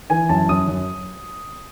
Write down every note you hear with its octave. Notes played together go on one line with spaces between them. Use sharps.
E3 G#5
F#2 A5
F#2 D#6
F#2